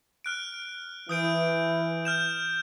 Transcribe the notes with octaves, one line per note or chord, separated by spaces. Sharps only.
F6 F#6 D7
E3 D#6 G6 D7
F6 G6 E7